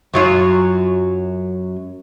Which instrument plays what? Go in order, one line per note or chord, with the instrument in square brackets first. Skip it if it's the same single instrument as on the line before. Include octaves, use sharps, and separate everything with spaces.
[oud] F#2 F#3 F4